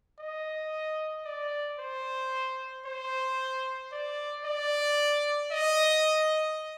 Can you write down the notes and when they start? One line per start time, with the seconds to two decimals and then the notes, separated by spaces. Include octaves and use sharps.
0.19 D#5
1.25 D5
1.79 C5
2.85 C5
3.92 D5
4.45 D5
5.51 D#5